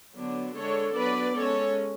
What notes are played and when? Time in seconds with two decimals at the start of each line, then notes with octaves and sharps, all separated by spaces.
0.15 D3 F#3 B3 D4
0.55 D3 G#3 D4 A4 C#5
0.96 F#3 B3 D4 B4 D5
1.37 G#3 C#4 A4 C#5